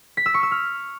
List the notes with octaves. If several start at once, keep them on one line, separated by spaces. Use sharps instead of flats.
B6
E6
C#6
E6
F6